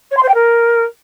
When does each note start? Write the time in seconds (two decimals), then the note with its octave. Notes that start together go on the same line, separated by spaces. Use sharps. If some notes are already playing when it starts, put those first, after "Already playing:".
0.11 C#5
0.16 C6
0.22 C5
0.28 G5
0.34 A#4